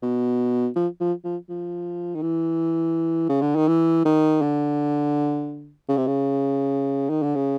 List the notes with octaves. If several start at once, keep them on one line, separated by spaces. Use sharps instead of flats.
B2
F3
F3
F3
F3
D#3
E3
C#3
D3
D#3
E3
D#3
D3
C#3
C3
C#3
D#3
D3
C#3